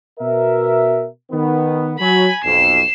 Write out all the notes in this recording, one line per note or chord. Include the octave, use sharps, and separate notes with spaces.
B2 A#4 E5
D#3 B3
F#3 G#5 B5
B1 F2 C7 E7